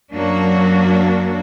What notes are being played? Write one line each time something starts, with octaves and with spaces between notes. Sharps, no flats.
F#2 F#3 A#3 D4 F#4